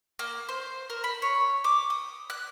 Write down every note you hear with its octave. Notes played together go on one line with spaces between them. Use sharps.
A#3
C5
A#4
B5
C#5
D6
D#6
F#6